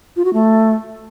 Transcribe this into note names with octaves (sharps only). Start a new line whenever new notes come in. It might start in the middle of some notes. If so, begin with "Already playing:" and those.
F4
F#4
A3